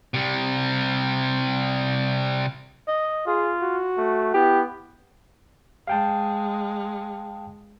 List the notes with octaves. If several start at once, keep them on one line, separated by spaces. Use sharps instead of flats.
C3 G3
D#5
F4 G#4
F#4
A3
B3 E4 G4
G#3 F5 G5 A5